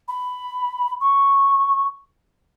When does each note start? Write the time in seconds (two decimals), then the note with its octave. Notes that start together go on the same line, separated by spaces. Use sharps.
0.08 B5
1.01 C#6